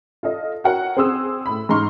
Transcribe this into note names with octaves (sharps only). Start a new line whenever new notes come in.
F4 A4 D#5
F#4 A#4 C#5 F#5
C4 G#4 C6 D#6 E6
A2 B5
G#2 A#5 C6 C#6 F6